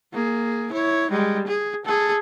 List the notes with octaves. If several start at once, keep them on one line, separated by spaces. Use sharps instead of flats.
A#3 G#4
E4 C#5
G3 G#3
G#4
G#4 A4